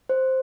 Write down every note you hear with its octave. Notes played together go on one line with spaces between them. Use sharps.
C5